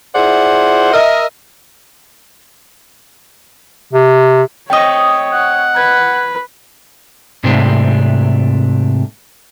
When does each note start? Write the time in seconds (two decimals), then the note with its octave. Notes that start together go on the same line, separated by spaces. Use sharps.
0.15 E4 F4 G#4 C5 D5 F#5
0.93 A#4 D#5 E5
3.93 C3
4.70 A3 C4 C#5 D#5 G5 D#6
5.33 F#5
5.76 B4 G#6
7.44 G#2 C3 A3 C4 D4